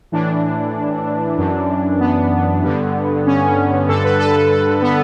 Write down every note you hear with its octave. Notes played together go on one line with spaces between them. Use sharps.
A2 E3 D4
F#2 E3
B3
G2 D3
C#4
G2 D3 A4
B4
A4
A4
A4
B3